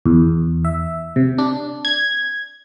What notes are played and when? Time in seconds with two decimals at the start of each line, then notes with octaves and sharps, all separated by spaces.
0.06 E2
0.65 E5
1.16 C3
1.38 D4
1.85 G#6